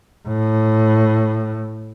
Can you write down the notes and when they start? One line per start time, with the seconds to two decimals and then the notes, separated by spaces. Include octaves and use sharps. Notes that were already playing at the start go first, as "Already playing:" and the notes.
0.28 A2